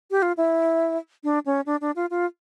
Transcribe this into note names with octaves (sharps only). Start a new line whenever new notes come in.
G4
F4
E4
D4
C#4
D4
D4
F4
F4